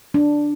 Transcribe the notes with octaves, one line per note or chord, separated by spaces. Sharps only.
D4